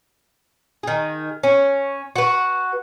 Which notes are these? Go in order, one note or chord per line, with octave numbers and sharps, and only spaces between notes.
D#3 G#4
C#4
F#4 B4